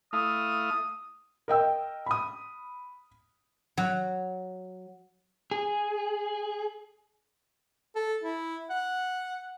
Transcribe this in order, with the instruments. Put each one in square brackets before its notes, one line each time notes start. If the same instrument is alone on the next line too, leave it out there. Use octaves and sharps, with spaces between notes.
[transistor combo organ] A3 E4 F5 [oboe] D#6
[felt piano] A#4 D#5 G5 E6
B5 D#6
[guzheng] F#3
[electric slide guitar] G#4
[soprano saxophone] A4
E4
F#5